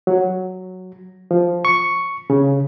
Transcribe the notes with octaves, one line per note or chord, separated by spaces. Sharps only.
F#3
F3
C#6
C#3